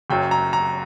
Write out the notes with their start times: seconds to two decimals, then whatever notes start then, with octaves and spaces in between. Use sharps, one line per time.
0.10 F#1 F#2 F#3 G5
0.31 A#5
0.53 A#5